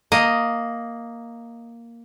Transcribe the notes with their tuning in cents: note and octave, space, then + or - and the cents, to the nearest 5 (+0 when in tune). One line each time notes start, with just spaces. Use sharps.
A#3 +0 D#5 +0